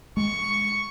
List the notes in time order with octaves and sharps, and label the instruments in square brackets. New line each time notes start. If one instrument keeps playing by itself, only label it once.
[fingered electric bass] G#3 [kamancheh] C#6